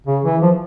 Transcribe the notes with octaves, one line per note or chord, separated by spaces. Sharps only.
C#3
E3
F3